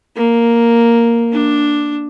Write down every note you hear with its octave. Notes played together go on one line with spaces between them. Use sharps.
A#3
D4